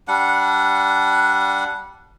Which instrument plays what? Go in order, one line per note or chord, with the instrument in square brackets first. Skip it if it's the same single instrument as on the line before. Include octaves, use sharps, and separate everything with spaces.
[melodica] G3 D4 F#5